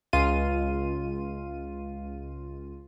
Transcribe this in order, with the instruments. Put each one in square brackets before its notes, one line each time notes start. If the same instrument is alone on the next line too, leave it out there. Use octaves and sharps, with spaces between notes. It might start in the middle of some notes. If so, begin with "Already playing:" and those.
[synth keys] C#2 F4 D#7